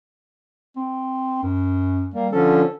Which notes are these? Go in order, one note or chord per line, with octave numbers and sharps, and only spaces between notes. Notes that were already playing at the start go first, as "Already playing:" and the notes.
C4
F#2
G3 A#3
D3 F3 C#4 A4